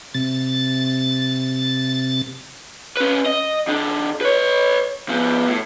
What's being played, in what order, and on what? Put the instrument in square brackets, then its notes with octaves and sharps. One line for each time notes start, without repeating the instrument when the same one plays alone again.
[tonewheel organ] C3 A6
[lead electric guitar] C#4 B4
D#5
D#3 D4
B4 C#5
F3 B3
A2